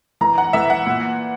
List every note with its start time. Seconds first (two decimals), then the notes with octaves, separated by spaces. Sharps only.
0.21 E3 A#5
0.38 F#5
0.53 E3 E5
0.70 F#5
0.86 A#2